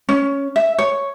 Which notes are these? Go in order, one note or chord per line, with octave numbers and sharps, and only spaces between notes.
C#4
E5
C#5